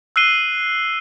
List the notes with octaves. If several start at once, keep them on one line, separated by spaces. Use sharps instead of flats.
E6 F#6 C7 D#7 G7